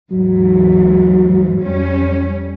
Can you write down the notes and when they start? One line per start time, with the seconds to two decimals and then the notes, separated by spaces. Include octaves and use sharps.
0.11 D#2 G#2 E3 F#3
1.59 F2 G3 C#4